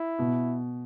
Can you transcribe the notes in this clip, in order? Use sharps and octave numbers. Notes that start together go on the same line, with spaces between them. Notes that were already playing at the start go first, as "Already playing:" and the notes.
Already playing: E4
B2